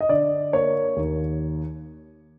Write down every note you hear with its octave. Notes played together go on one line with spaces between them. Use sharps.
D#5
D3 D5
A#3 C#5
D#2